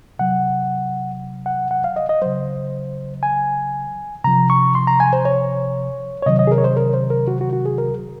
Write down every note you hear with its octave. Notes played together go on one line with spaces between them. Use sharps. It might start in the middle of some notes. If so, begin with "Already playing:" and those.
C3 F#3 F#5
F#5
F#5
F5
D#5
D#5
C#3 F#3 C5
G#5
C3 F3 A#5
C#6
C6
A#5
G#5
C5
C#5
C#5
C3 D#3 F#3 D#5
D#5
G#4
A#4
C#5
C5
A#4
C5
A#4
F#4
F#4
F#4
G#4
A#4